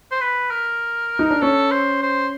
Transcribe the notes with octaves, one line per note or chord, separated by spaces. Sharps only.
C5
B4
A#4
D#4
D4
C#4 A4
C5
C5